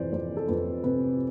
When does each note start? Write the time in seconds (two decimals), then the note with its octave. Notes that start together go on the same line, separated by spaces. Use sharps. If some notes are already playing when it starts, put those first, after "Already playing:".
Already playing: F2 C3 E3 C5 D5
0.12 F2 C5
0.37 A4
0.48 F2 B4
0.84 C3 B4